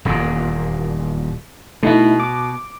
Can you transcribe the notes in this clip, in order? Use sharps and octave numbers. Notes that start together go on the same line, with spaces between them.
D#1 E2 A#2
B2 A3 D#4 E4
D6